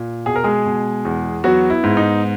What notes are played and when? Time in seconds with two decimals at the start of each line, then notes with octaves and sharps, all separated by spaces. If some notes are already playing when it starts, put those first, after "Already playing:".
Already playing: A#2
0.26 B2 G#4
0.36 A#4
0.44 G#3 G#4
0.65 B2
1.05 E2
1.44 F#3 B3 F#4
1.70 E4
1.84 G#2
1.97 D#4